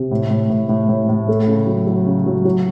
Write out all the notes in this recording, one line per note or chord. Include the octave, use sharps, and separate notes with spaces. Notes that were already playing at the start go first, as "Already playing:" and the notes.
Already playing: C3
A2
A2
A2
A2
A2
A2
A3
C#3
F#3
F#3
C#3
F#3
F#3